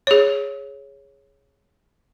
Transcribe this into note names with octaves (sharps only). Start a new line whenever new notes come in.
G#4 C#5